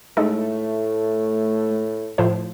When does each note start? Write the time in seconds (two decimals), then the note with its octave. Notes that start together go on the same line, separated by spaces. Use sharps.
0.17 A2 G#3 A3 D#4 A4
2.18 A2 F3 C5